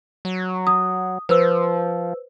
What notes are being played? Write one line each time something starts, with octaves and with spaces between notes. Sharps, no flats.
F#3
D#6
F3 B4 C5 E6